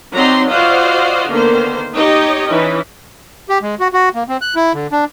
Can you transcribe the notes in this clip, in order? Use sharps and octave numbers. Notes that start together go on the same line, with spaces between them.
F#3 C4 D#4 D5 A#5 C6
F4 F#4 C5 D5 D#5 F5
D3 D#3 A#3 B3 C5
D#4 G4 C#5 D#5 G5
E3 C#4 D#4 E4
G4
G#3
F#4
F#4
A#3
C4
F#6
E4
D3
D4